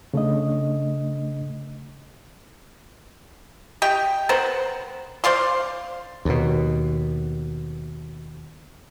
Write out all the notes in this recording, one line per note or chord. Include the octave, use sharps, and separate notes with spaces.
C#3 A3 D4 D#5
G4 D#5 G5
B3 A#4 C5 F#5
C5 D5 F5 C6
D#2 B2